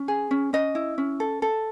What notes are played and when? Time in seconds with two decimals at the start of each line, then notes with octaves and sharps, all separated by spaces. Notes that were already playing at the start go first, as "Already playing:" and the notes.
Already playing: C#4
0.08 G#4
0.31 C#4
0.53 C#4 D#5
0.75 E4
0.98 C#4
1.20 A4
1.42 A4